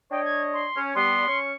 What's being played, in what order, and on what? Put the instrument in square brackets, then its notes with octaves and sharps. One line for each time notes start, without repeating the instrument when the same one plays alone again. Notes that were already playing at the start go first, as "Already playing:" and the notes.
[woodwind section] D4 C#5 D#5 [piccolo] G5
[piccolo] G#6
C6
[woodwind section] C#4
[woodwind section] G3 B3 [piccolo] C6
[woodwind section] C#4 C#6